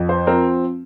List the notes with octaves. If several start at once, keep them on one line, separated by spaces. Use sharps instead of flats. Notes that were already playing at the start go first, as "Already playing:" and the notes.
Already playing: F2
C5
F3 C4 A#4